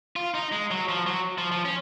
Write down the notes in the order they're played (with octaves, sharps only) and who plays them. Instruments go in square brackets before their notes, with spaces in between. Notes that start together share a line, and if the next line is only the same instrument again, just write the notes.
[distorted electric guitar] F4
D#4
G#3
F#3
F3
F#3
F3
F3
C#4